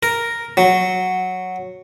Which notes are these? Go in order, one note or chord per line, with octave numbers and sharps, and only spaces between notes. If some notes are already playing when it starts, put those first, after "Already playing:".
A#4
F#3